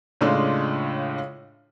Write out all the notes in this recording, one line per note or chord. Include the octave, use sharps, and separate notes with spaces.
A2 C#3 G#3 D4 F4 A4